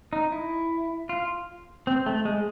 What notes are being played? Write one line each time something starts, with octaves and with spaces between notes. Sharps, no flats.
D#4
E4
F4
C4
A3
G#3